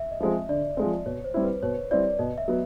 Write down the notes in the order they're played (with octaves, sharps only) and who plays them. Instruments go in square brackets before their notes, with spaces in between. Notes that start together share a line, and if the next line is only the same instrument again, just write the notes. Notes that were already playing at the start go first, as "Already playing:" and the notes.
Already playing: [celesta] E5
D#5
[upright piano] F3 G#3 C4
[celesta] E5
[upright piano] D3 [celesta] D5
[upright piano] F3 G#3 C4
[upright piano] B2 [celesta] C#5
[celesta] C5
[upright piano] G3 C4 E4
[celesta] B4
[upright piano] B2 [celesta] C#5
[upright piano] G3 C4 E4 [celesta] D5
[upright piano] B2 [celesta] D#5
[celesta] E5
[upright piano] F#3 B3